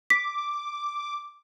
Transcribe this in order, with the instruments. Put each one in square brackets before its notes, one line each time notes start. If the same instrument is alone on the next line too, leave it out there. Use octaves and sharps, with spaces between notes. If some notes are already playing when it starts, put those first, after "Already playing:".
[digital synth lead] D6 [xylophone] B6